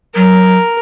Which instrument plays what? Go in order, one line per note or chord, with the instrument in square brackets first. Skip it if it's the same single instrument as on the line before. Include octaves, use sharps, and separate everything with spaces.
[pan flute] F#3 [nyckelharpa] A#4